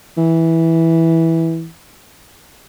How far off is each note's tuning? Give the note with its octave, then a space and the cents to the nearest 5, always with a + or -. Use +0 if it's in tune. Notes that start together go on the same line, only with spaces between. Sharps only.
E3 -10